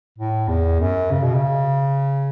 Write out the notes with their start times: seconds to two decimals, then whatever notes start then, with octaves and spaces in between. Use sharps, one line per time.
0.18 A2
0.48 E2
0.80 F#2
1.11 C#3
1.23 B2
1.35 C#3